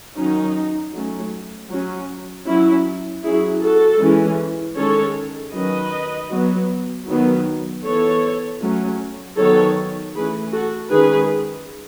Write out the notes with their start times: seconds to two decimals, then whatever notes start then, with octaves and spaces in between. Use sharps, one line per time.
0.16 D#3 F#3 C#4 D#4
0.94 F#3 A3 C#4
1.70 F#3 C#4
2.47 F#3 C#4 E4
3.23 F#3 C#4 E4 G#4
3.61 F#4 A4
4.00 E3 G#3 C#4
4.76 D#3 G#3 C#4 A4 C#5
5.53 D#3 F#3 C#4 B4 D#5
6.31 F#3 B3
7.08 D#3 F#3 B3
7.84 E3 B3 A4 C#5
8.61 F#3 A3 C#4
9.38 D#3 F#3 B3 A4 C#5
10.15 E3 A3 C#4 G#4 B4
10.53 F#4 A4
10.91 D#3 G#3 C#4 G#4 B4